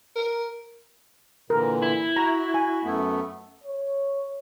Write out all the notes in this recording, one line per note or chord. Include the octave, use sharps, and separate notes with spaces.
A#4
A#2 D3 E3 A#4
E4
F#4 A#5
G#5
F#2 A3 B3
C#5